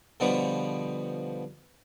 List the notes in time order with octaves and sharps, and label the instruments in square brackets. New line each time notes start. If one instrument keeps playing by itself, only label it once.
[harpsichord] B2 D3 F3 G3 B3